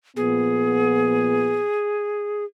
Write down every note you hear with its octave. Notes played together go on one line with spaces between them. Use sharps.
A#2 F3 B3 G#4